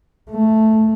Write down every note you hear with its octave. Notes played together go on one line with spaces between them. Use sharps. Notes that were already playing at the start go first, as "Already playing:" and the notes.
A3